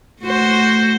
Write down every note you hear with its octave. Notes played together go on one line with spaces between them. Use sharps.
A3 F#4 C5